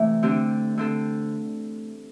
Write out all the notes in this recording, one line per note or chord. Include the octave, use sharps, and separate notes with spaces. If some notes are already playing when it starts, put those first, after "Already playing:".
Already playing: C3 E3 A3
D3 C4 G4
D3 C4 A4